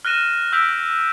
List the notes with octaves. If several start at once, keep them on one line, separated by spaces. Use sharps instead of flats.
F6 F#6 A#6 D#7 E7
E6 G6 B6 D7 F7